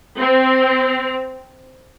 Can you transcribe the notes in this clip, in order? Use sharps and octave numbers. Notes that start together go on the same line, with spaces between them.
C4